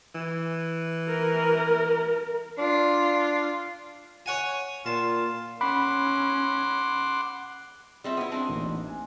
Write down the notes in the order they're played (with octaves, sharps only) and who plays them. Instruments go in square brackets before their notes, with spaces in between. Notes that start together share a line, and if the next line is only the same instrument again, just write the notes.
[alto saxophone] E3
[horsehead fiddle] A#4
[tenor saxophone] D4 [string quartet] F4
[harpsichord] C#5 F#5 G#5
[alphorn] A#2 [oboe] F4 [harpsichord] A5
[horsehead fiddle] C#4 [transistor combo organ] F#5 C6 D6 [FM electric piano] B5
[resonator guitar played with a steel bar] G3 C4 E5 [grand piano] F4 G#4
[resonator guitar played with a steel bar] B3 E4
[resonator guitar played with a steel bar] C4 D4 [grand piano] A5
[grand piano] A1 A#2 D#4
G#5